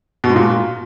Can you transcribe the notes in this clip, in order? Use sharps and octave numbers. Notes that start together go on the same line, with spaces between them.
B2
G#2
A#2